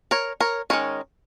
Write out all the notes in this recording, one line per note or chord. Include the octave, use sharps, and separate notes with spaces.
A#4 C#5
A#4 C#5
D#3 G#3 C#4 A#4 C#5